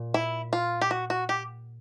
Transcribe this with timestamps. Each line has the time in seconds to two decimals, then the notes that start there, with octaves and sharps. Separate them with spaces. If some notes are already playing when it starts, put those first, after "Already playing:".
Already playing: A#2
0.14 E4
0.53 F4
0.81 G4
0.91 F#4
1.10 F#4
1.29 G4